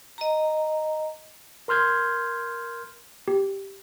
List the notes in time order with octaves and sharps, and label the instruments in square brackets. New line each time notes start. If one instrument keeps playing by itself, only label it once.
[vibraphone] D#5 A#5
[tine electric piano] A#4 C6 F6 G6 G#6
[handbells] G4